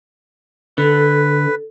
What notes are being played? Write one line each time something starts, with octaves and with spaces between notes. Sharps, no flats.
D3 A4 B4